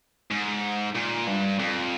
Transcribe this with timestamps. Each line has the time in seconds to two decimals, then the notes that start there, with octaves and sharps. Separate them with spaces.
0.31 G#2
0.95 A#2
1.27 G2
1.59 F2